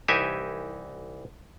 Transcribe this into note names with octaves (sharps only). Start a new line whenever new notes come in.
C2 E3 D#4 G4 E5 G#5